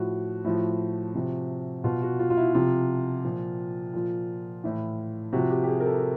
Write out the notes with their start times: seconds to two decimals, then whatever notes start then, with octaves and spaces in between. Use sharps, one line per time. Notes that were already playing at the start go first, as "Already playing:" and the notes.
Already playing: A2 F3 F#4
0.44 A2 F3
1.15 C3 F3
1.84 B2 F4
2.02 F#4
2.19 F4
2.30 F4
2.37 E4
2.54 C3 F3 F4
3.24 A#2 F3
3.93 A#2 F3
4.64 A2 E3
5.33 C3 F3 F#4
5.51 G4
5.64 G4
5.67 G#4
5.80 A#4
5.86 A4